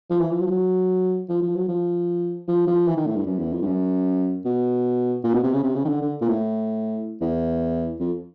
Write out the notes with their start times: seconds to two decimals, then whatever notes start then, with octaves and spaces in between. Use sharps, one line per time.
0.10 F3
0.20 E3
0.31 F3
0.40 F#3
0.46 F3
0.50 F#3
1.29 F3
1.42 F3
1.55 F#3
1.68 F3
2.48 F3
2.67 F3
2.87 E3
2.97 D#3
3.06 A2
3.16 G2
3.26 F#2
3.39 E2
3.53 F2
3.62 G2
3.66 F#2
4.45 B2
5.24 A#2
5.34 B2
5.43 C3
5.54 C#3
5.63 C3
5.76 C#3
5.85 D#3
5.89 D3
6.02 D3
6.21 A#2
6.28 A2
7.21 E2
8.00 F2